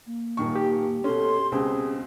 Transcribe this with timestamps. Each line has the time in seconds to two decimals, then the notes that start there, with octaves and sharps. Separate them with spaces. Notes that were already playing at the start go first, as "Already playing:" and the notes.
0.07 A#3
0.37 D#1 D#3 C#6
0.56 G4
1.04 B2 C#4 A4 C6
1.52 C#2 B2 C4 C#4 G#4